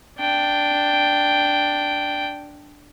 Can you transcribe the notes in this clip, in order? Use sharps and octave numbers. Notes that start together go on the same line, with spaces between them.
D4 G5